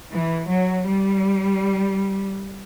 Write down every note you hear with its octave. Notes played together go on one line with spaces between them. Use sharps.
E3
F#3
G3